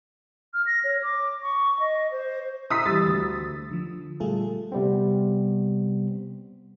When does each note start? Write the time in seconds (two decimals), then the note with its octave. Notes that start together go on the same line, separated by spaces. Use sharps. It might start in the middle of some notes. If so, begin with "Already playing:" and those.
0.54 F6
0.66 A#6
0.84 C#5
1.03 D6
1.43 C#6
1.80 D#5
2.11 C5
2.70 E4 A#5 C6 D#6 E6 B6
2.86 E3 G3 A6
3.06 D2
3.71 D3 F3
4.20 A#2 G3 A3 F4 G#4 A4
4.72 C3 G3 B3 C4